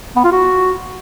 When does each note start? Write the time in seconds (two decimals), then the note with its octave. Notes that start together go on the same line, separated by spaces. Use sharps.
0.16 B3
0.24 F4
0.32 F#4